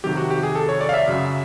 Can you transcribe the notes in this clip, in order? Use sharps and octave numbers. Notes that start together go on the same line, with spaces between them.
F2 C3 D#3 F#3 G4
F#4
G4
G#4
A4
C#5
D5
F5
E5
F#2 C#3 F#3